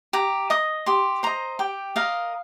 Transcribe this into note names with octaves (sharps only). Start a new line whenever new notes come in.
G4 A#5
D#5 D#6
G4 C6
C5 D#5 A#5
G4 G5
A#4 D#5 F5